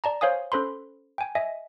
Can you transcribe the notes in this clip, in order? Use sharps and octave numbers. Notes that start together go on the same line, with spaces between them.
D5 A5 A#5
C5 C#5 F5 G#5 D#6
C#4 A4 C5 B5 C6
G5 G#5
D#5 E5 G#5